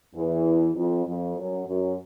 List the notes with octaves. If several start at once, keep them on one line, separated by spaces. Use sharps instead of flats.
E2 E3
F2 F3
F2 F3
F#2 F#3
F#2 F#3